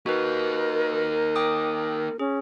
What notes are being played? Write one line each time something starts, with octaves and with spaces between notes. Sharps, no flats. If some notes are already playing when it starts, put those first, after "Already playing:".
A#3 D#4 F#4 A#4 B4
G5 D6 D#6
C#4 G#4